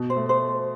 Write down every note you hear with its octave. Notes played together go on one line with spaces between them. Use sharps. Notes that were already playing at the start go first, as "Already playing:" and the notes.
Already playing: B2
C5
A3
C5